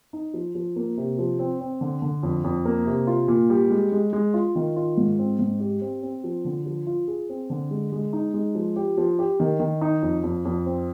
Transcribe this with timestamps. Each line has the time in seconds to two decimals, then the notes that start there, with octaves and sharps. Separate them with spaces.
0.13 D#4
0.34 F3
0.55 F3
0.76 A#3
0.97 C3
1.18 F3
1.39 C4
1.61 C4
1.81 D3
2.02 D3
2.23 F2
2.44 F2
2.65 A#3
2.86 C3
3.07 F4
3.28 A#2
3.50 G3
3.71 G#3
3.92 G#3
4.13 G#3
4.34 F4
4.55 D#3
4.76 F4
4.97 G#2
5.19 C4
5.39 G#2
5.60 G4
5.81 C4
6.03 C4
6.24 F3
6.45 D3
6.66 F3
6.87 F4
7.08 G#4
7.29 C4
7.50 D3
7.71 G#3
7.92 G#3
8.13 D#4
8.34 G#3
8.55 F3
8.76 G4
8.97 F3
9.19 G4
9.40 D#3
9.60 D#3
9.81 D#4
10.03 F2
10.23 F2
10.45 F2
10.66 C4